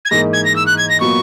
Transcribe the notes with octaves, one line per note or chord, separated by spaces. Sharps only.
G#6
G#2 E3 A#3 D#4 G#4 A#6
G#6
A#6
E6
F#6
G#6
A#6
A#2 F#3 B3 C#6